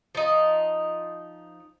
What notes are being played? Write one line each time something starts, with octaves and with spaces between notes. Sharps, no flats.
F3 D#4